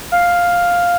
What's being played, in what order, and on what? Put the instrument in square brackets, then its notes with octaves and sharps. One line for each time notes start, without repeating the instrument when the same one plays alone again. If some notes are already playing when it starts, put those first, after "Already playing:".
[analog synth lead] F5